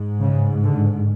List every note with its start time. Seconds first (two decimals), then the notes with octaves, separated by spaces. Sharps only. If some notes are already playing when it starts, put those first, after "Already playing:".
Already playing: G#2
0.21 C#3
0.63 D3